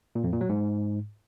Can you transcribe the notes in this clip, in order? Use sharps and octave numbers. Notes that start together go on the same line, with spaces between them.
A#2
F2
A#2
F#3
G#2